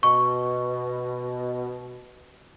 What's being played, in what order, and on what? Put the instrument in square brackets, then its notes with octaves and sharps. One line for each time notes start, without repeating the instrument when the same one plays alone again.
[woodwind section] B2 [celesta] C#6